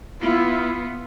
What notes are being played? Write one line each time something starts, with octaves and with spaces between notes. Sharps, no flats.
B3 E4 F4